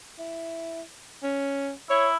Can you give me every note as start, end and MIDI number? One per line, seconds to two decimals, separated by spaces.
0.19 0.82 64
1.23 1.72 61
1.90 2.17 64
1.90 2.08 73